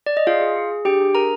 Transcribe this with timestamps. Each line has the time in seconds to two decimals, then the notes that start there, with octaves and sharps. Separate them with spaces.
0.06 D5
0.17 D#5
0.26 F4 G#4 F5
0.41 G#4
0.56 G#4
0.71 G#4
0.85 D4 G4 G5
1.01 D4
1.15 G#4 A#4 A#5